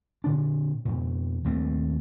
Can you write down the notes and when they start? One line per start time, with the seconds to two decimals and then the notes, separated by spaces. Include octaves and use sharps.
0.24 A#2 D3 D4
0.85 F2 B2
1.44 D#2 A#2 A3 C4